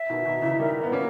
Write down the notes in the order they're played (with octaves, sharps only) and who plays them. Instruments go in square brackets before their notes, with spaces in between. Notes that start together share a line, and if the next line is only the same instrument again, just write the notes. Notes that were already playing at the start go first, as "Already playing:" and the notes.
Already playing: [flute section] E5
[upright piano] B2 D#3
[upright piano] B2 D#3 [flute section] A#5
[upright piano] C#3 E3
[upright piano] D#3 G3 [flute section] A#4
[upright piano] B3
[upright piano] A#3 C#4 [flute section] A#4